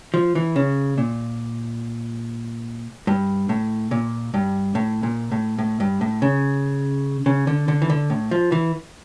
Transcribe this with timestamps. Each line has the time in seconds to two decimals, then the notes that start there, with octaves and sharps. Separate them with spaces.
0.14 F3
0.35 E3
0.56 C#3
0.98 A#2
3.07 G2
3.49 A2
3.91 A#2
4.34 G2
4.75 A2
5.03 A#2
5.32 A2
5.58 A2
5.80 G2
6.01 A2
6.22 C#3
7.26 C#3
7.47 D3
7.68 D3
7.82 E3
7.90 D3
8.10 A2
8.31 F3
8.52 E3